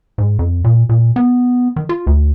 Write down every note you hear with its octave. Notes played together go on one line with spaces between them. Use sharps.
G#2
F2
A#2
A#2
B3
D#3
F4
D2